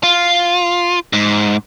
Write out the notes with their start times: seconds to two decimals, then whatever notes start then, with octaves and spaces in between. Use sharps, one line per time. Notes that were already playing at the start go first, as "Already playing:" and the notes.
0.03 F4
1.13 G#2